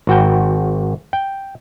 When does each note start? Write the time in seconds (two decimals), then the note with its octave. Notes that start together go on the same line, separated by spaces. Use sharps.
0.07 G#1 F#4 G5
1.13 G5